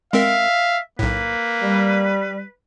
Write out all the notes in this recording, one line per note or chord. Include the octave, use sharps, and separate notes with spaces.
G#3 C4 A#4 E5 F5
B1 A2 A#3 B4
G3